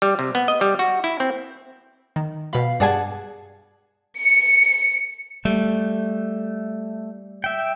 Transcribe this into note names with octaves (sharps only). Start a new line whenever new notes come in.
G3
C3
B3
D#5
G3
F#4
E4
C4
D#3
B2 F5 B5
G2 G#4 D5 F#5 A5 G#6
C#7
G3 A3
E5 G5